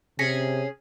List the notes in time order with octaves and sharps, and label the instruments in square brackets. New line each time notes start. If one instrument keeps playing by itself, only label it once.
[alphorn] C3 [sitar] C#4 G#4 [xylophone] A#6 B6 C#7